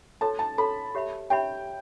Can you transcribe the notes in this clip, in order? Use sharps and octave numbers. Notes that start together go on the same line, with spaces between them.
F#4 A4 C#5 A5
A5
F#4 A4 C#5 B5
G4 C#5 E5 B5
G4 C#5 E5 G5 B5